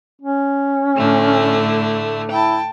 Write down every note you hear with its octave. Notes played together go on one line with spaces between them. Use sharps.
C#4
A2 D3 A3
E4 G5 A5